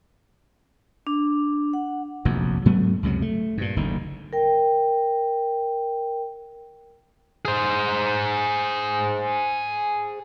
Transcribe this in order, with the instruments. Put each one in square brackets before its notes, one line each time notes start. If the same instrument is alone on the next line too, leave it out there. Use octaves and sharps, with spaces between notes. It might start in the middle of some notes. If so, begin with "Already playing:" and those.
[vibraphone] D4
F#5
[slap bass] F1 A#1 F#2
G#2 F#3 A3 B3
C#2 F#2 C3 F#3
A3
G2 A#2
F#1 D2 D#3
[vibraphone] A#4 G5
[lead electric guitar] G#4 C5